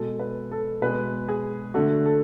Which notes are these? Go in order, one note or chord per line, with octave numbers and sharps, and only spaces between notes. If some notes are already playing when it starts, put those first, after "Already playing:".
Already playing: B2 G#3 A4
B4
A4
B2 G#3 B4
G#4
D3 A3 F#4
A4